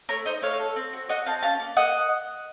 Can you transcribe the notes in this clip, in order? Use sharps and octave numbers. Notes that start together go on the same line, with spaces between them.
A3 A#4 C#5
D#4 C5 D#5
A3 C#5 F5
A4
C4
F#4
F#4 D#5 F#5
C4 F5 A5
C#4 F5 A5
A#3
A#3 D#5 F#5